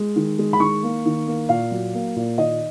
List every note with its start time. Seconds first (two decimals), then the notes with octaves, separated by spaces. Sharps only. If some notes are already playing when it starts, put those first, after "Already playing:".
Already playing: G#3
0.16 D#3
0.39 G#3
0.53 B5
0.60 D#3 C#6
0.83 A#3
1.06 D#3
1.27 A#3
1.49 A#2 F5
1.71 F#3
1.94 A#3
2.16 A#2
2.38 D#3 D#5